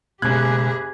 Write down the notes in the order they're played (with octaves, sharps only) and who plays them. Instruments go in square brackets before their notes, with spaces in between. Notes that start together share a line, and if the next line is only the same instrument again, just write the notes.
[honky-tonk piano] F#1 F#6 [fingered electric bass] B2 G#3 B3 [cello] G4 G#4 [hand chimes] G#6